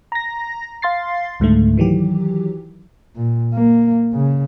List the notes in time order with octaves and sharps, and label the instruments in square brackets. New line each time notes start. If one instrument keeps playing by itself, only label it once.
[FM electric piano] A#5 A#6
F5 C6 A6 C7
C#2 G#2 D3 A3
D#3 E3 F#3 G4
[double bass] A#2
A#3
C#3